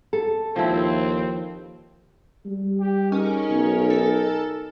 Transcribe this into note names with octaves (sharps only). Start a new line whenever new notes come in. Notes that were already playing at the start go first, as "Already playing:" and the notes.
A4
D#2 F3 C4 E4
G3
G4
C#4 D#4 G#4 A#4
B1
A4